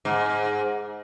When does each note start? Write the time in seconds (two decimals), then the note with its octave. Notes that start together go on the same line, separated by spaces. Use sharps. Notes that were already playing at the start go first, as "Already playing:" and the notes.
0.05 G#2